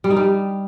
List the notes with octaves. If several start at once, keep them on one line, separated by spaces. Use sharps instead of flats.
G3
D#4
G3